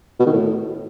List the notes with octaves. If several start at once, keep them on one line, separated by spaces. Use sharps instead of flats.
B2
D#3
A2